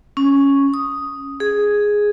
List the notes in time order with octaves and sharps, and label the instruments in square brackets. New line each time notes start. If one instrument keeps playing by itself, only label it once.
[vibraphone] C#4
D#6
G#4